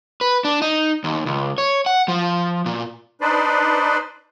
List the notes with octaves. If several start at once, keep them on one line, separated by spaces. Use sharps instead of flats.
B4
D4
D#4
D#2
C#2
C#5
F#5
F3
A#2
D4 D#4 B4 C5 D5